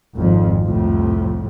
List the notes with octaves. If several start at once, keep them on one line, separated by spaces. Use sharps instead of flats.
G#1 F2
C2 F2 A2